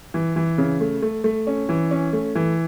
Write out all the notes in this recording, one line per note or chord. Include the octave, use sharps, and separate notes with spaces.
E3
E3
C#3
A3
A3
A3
C#4
E3
C#4
A3
E3